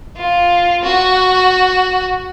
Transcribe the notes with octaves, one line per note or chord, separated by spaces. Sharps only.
F4
F#4